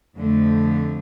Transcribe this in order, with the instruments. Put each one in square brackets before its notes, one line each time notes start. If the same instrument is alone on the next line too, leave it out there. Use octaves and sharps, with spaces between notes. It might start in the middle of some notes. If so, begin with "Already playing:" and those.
[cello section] F2 D3 A3